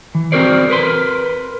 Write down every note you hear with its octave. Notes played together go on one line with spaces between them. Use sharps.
E3
C4 C#4 F#4 A#4 C5 D5
A#4 B4 C6